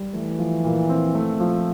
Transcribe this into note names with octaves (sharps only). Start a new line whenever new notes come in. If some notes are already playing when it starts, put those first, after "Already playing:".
Already playing: G3
E3 A3
F3
A#2
C4
A3
F3